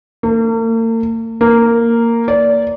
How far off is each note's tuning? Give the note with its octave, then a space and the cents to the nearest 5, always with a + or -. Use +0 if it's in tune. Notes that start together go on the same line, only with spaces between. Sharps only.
A#3 -45
A#3 -10
D5 -25